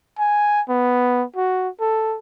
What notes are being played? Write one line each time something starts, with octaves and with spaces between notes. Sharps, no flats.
G#5
B3
F#4
A4